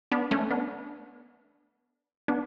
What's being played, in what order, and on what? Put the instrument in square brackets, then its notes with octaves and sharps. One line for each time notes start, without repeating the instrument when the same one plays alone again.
[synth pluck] B3 D4
A3 C#4
B3 D4
B3 D4